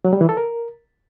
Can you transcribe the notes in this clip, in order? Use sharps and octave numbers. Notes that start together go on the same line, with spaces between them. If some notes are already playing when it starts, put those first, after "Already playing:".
F#3
G3
E3
A4
A#4